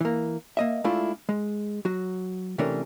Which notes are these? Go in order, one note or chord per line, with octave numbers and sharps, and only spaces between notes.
E3 A#3
A#3 D#5 E5
G#3 A3 D4 E4 F4
G#3
F#3 F#4
C3 E3 A3 C#4 D4 A#4